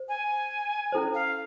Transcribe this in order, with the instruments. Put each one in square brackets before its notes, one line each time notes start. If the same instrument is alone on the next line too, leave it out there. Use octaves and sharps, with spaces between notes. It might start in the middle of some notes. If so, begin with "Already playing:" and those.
Already playing: [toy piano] C5
[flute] G#5
[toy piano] C#4 E4 A4 C5
[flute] F5